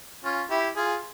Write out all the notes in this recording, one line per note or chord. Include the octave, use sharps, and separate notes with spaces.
C#4 F4
E4 G4
F4 G#4